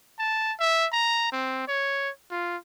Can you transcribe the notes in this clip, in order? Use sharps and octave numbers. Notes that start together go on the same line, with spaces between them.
A5
E5
A#5
C4
C#5
F4